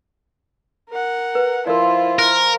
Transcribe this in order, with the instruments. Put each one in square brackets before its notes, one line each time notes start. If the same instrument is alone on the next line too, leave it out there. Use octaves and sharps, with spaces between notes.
[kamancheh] A#4 F#5
[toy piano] B4
[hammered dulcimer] F3 [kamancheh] E4 F4 [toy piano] A#4 D5
[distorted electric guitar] A#4 [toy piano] C5